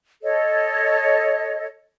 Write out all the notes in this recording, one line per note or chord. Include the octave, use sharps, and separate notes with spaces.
A4 C#5 D#5